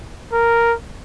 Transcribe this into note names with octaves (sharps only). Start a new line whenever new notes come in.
A#4